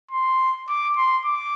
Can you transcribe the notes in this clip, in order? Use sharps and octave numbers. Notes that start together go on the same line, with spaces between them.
C6
D6
C6
D6